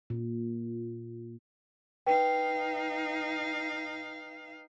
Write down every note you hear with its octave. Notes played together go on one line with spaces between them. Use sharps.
A#2
D#4 B4 F5 G5